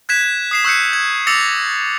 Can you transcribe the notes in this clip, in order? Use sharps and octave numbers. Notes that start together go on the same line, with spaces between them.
F#6 G#6 B6 E7
D#6 C7 E7
C#6 E6 F#6 G6 C7 C#7
G#6
D6 E6 A6 A#6 C#7 F7